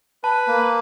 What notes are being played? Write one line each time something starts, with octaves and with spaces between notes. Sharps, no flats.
B4 A5
A#3